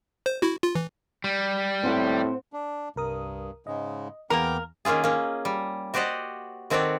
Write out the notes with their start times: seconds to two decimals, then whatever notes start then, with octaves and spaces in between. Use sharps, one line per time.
0.26 C5
0.42 E4 F#4
0.63 F4
0.75 E3
1.24 G3
1.83 A2 C4 F#5
2.53 D4
2.96 C2 G2 A#4 D#6
3.67 G#2 C#3 G#3 D#5
4.30 E2 A#3 B3 G#4 A#4 G5 D6
4.85 D#3 A#3 C#4 F4 G#4
5.04 A#3 C#4
5.45 G3
5.94 F#4 G4 C5 D5 D#5 F#5
6.70 D#3 C4 F#4 A4 C#5 D5